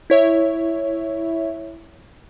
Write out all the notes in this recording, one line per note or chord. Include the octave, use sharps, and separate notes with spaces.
E4 C#5 E5